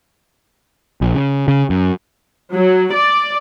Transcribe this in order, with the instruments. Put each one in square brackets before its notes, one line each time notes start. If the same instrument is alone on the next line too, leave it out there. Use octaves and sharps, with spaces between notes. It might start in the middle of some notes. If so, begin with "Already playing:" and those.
[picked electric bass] A#1
C#3
C#3
F#2
[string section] F#3
D5